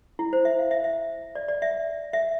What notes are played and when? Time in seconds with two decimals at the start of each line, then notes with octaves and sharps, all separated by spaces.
0.19 E4
0.33 C5
0.45 E5
0.58 F5
0.71 E5
0.84 E5
1.35 D5
1.48 D5
1.62 E5
2.13 E5